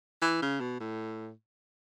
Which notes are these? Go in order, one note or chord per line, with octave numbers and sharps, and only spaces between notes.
E3
C#3
B2
A2